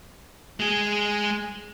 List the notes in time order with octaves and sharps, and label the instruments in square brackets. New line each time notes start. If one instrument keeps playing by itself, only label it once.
[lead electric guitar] G#3 G#4